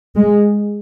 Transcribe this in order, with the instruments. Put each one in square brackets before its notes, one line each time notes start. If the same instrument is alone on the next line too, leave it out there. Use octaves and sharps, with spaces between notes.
[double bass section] G#3